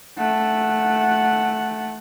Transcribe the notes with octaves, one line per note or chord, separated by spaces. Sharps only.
A3 F#5